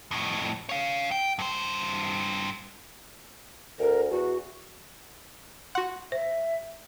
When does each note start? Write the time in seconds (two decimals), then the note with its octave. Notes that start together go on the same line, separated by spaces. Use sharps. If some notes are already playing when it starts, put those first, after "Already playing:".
0.11 F2 A2
0.69 C#5 F5
1.11 G5
1.39 G2 C5
3.79 D2 A#4
4.11 E2 F#4
5.75 F#4 F#5 C6
6.12 C5 E5